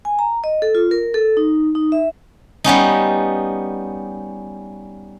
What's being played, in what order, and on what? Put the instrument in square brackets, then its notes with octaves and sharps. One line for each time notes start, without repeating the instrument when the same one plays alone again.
[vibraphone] G#5
A#5
D#5
A4
F4
A#4
A4
D#4
D#4
E5
[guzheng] G3 B3 C#4 D#4